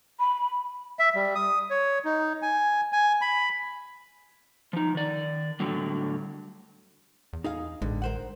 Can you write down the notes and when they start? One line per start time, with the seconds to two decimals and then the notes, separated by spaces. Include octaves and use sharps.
0.20 B5
0.99 E5
1.15 G3
1.35 D#6
1.70 C#5
2.05 D#4
2.42 G#5
2.93 G#5
3.21 B5
4.73 F3 D#4
4.95 D#3 D5
5.60 A2 D3 F#3 G3
7.33 E2
7.44 D#4 G#4 F5
7.82 A1 G2 D3 G#3
8.02 A#4 C5 F#5